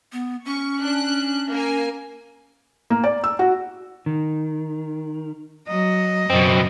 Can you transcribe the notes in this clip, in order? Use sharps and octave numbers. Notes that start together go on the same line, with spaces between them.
B3
C#4 C#6
D4 F#6
A#3 G#5
A#3
D5
E6
F#4
D#3
F#3 D#5
F#2 B2 C4